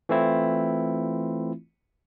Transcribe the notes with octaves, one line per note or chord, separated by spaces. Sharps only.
E3 A3 C4 E4 F4